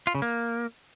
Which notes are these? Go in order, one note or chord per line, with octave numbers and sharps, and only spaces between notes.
F4
C#3
A#3